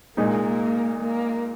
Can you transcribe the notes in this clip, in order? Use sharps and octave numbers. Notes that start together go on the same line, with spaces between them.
A#2 G#3 A#3 D#4
A#3